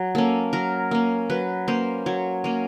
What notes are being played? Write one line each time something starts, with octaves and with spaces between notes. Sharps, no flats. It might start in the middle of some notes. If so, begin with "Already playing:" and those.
Already playing: F#3
A#3 C#4 A4
F#3 A#4
A#3 C#4
F#3 B4
A#3 C#4 C5
F#3 C#5
A#3 C#4